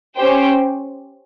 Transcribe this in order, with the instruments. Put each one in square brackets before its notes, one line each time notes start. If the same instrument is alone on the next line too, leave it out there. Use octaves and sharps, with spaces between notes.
[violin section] C#4 G4 C5 G5